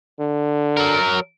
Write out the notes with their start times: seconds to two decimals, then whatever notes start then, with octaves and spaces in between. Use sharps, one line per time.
0.20 D3
0.77 F#3 A#4